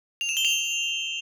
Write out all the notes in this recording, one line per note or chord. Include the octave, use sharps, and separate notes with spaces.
F7
E7
G7
F7